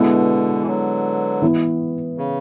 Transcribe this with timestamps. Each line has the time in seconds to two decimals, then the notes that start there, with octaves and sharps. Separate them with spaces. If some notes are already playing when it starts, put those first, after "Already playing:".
Already playing: B2 D3 G#3 B3 E4
0.63 E3
0.67 D3 F#3
1.42 E3 B3 E4
2.18 C#3